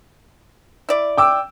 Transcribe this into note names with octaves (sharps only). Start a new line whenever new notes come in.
E4 D5
G5 D6 E6